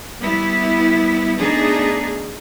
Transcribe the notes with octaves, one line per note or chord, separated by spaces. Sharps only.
G3 B3 E4
A3 B3 D4 D#4 G#4